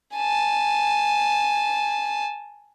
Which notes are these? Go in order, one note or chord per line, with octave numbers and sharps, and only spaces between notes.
G#5 A5